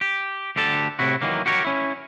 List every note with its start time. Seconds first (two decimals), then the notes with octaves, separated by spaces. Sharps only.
0.01 G4
0.56 D2 D3 G4 A4 A5
0.99 A2 C3 E4 F#4
1.21 D#3 E3 F#3 A#3
1.46 F#4 G4 A#4 C#5
1.65 C#4 E4